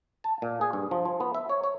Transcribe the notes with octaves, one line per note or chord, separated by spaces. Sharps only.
A5
A#2
G#4
G2
F3
F3
B3
E5
C#5
C#5